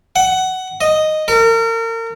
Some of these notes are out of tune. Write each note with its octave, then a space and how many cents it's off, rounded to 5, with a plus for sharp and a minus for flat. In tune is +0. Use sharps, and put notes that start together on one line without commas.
F#5 +15
D#5 -5
A#4 -35